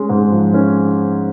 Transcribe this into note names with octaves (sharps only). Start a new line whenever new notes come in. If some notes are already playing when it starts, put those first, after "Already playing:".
Already playing: G#3 C#4
G#2
F3
C#4